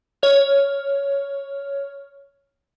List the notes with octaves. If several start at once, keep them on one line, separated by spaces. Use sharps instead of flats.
C#5 F6